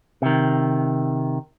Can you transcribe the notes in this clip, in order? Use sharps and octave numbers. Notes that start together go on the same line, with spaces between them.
C3 D#3